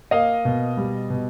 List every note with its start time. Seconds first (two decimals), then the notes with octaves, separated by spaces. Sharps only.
0.11 A#3 D#5 F5
0.45 B2
0.77 G3
1.10 B2